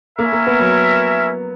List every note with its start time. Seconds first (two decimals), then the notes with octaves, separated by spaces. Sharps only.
0.19 A#3 C#4 E4 A#4 E5
0.32 A#3
0.47 B3
0.60 F#3